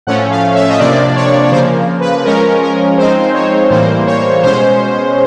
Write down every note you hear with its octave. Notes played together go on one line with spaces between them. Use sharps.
A2 F3 A3 C#4 F#5
F5
E5
D#5
C3 F3 A#3 D4 D5
C#5
C#5
C#3 F3 A#3 C5
B4
F3 G#3 C#4 A#4
A#4
F3 G#3 C4 D#4 C5
C#5
A2 E3 G3 A#3 C5
C#5
B2 G#3 C#4 C5